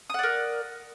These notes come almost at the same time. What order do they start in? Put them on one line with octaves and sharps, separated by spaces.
D#6 F#5 D5 A#4